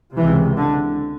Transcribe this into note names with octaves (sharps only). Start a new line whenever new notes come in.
C#2 C3 E3
D3